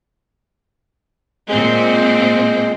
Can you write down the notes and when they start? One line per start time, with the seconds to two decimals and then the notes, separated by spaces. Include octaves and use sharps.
1.49 A#2 G#3 C4